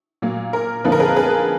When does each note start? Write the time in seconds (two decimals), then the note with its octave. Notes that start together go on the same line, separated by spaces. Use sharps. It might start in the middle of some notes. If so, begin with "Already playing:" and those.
0.22 A#2 F#3 A#3
0.53 A#4
0.84 F2 D3 F3 A#3 D#4 B4
0.92 A#4
1.00 G#4 B4
1.16 G#4 B4